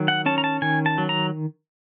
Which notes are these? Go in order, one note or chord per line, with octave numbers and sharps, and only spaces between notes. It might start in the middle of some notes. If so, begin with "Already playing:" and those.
Already playing: D#3 F#3
F#5
C#4 A5
A#5
A5
D#3 G#5
A5
F#3
A#5